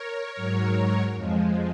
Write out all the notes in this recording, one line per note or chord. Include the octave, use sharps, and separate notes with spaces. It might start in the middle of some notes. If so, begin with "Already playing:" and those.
Already playing: A#4 C#5
G#2 F#3
F2 F3 G#3